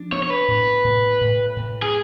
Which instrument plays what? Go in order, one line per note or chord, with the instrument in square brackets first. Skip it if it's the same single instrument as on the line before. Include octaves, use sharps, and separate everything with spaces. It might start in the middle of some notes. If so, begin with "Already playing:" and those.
Already playing: [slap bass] F3 D4
[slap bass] B3 [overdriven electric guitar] C#5
[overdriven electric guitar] C#5
B4
[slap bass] A2
A2
A2
A2
[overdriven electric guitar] G#4